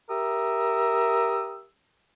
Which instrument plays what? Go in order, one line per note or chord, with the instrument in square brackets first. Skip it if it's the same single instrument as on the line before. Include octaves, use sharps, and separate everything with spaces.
[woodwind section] G4 A#4 E5 D#6 E6